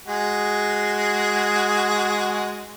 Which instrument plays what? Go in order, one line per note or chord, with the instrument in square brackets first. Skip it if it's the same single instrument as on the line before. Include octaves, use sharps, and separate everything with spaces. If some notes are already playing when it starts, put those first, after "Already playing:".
[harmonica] G#3 F#4 G#4